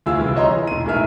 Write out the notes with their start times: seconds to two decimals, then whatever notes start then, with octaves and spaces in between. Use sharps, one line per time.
0.06 D2 E4 F4 G#4 E6
0.18 C2 E3
0.35 C#5 D#5 A#5 C6
0.47 E3
0.67 E1 D#7
0.86 B1 A2 G#4 A#4 E5 F6